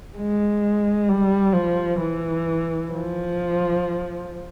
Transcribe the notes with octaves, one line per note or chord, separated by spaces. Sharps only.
G#3
G3
F3
E3
F3